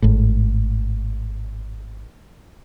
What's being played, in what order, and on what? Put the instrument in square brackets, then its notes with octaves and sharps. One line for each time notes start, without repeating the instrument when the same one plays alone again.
[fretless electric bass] G#1 A2